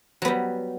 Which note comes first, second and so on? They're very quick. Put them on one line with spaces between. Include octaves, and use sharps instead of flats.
F#3 B3 G3